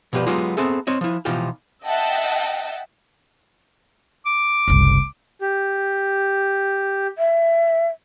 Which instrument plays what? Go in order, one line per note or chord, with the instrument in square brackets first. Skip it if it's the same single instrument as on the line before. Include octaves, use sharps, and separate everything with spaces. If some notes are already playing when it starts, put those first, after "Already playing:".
[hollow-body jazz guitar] B2 F3 G3 G4 B4
F#3 G#3 B3 D#4 F4 G4
B3 C4 G#4 A4 E5
C4 C#5 D#5
F3 E4
B2 E3 F3 D#4 F4 G4
[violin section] D#5 E5 F#5 G5 A5
[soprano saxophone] D6
[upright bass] F#1 C2
[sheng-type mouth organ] G4
[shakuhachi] E5